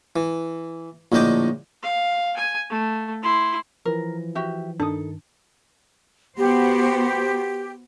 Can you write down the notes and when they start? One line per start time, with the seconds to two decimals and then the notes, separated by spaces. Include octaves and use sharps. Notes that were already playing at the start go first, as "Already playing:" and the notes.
0.16 E3
1.12 A#1 A2 D3 D#5 G5 D6
1.83 F5
2.37 G#5
2.70 A3
3.22 E4 C6
3.85 E3 F3 A#4
4.35 F#4 G4 E5
4.80 G2 D#3 D4 D#4 A4 D#6
6.37 B3 F#4 G4 C5